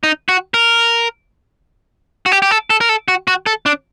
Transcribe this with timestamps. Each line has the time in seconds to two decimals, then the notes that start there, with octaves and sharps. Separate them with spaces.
0.03 D#4
0.29 F#4
0.54 A#4
2.26 F#4
2.32 G4
2.42 G4
2.51 A4
2.70 A4
2.81 A#4
2.89 A4
3.08 F#4
3.28 F#4
3.46 A4
3.66 D4